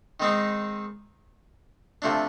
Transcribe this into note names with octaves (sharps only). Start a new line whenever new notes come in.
D#3 G#3 C4 D#4
C3 F3 A3 D4